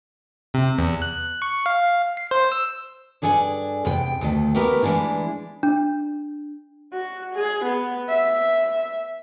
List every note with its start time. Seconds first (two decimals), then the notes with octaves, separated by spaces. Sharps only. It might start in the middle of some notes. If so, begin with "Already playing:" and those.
0.54 C3
0.78 E2
1.02 F#6
1.42 C#6
1.66 F5
2.17 C7
2.31 C5
2.52 E6
3.22 G2 D4 G#4 A4 C#5 G#5
3.85 E2 C3 G5
4.21 D2 D#3 A3
4.55 A3 B3 E4 G4 A#4 B4
4.83 E3 G#3 D4 E4
5.63 D4
6.93 F#4
7.35 G#4
7.65 B3
8.09 E5